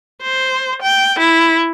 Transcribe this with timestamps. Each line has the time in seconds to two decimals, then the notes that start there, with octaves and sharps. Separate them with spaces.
0.22 C5
0.82 G5
1.19 E4